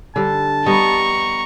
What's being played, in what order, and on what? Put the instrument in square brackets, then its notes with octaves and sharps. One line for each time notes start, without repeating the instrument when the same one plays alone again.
[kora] D3 G3 [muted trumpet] A5
[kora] G3 B3 D#5 [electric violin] A#5 C#6